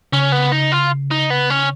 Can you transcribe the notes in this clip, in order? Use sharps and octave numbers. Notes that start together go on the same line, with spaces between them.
C#3 C#4
B3
D#4
F4
D#4
B3
C#4